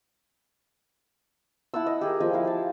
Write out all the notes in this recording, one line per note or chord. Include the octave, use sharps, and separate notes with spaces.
E4 F#5 A5 E6
D#5
G4 G#4 A#4
F3 D#5 G#5 B5
E4 F5
G4 A5